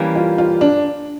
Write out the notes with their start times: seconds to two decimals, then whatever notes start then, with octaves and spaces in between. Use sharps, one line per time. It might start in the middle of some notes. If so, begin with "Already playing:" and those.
Already playing: E3 G3 A#3 C#4
0.16 F4
0.38 F4
0.61 D4